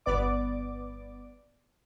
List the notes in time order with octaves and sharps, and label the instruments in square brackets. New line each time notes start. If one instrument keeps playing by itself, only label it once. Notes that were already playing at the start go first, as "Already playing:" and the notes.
[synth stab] G1 B3 D5 D6